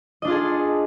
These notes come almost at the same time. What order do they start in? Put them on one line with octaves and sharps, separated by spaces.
D#5 D4 F4 G#4 A4